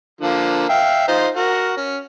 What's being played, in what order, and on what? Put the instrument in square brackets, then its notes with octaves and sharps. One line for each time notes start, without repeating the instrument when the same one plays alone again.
[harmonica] D3 F3 A#3
E5 F5 G5
D#4 F4 C5
F#4 A#4
C#4